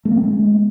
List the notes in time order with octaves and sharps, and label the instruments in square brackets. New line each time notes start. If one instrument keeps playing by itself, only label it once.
[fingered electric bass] A3
A#3
C4
G#3